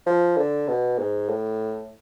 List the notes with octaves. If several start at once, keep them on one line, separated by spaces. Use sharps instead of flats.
F3
D3
B2
G#2
A2